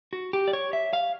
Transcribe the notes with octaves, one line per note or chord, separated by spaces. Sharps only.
F#4
G4
D5
C#5
E5
F5